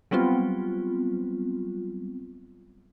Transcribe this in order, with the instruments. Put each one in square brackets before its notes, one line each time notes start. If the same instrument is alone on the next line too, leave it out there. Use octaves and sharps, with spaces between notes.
[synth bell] F#3 G3 B3 C4 F4